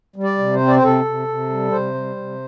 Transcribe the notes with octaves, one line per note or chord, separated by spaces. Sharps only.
G3
D5
C3
C5
C4
D5
C5
C3 A4
C3
C3
G3
C3 C5
G3
C3